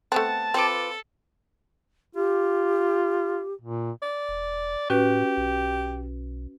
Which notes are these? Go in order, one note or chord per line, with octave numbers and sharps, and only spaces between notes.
A3 B3 C4 F#5 A5
C4 F4 A4 B4 D6
F4 G4
A#2
D5
E1
A2 C#4 F#4 G4 B4
B1